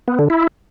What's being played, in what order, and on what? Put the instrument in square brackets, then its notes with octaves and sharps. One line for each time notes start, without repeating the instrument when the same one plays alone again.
[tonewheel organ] B3
D3
E4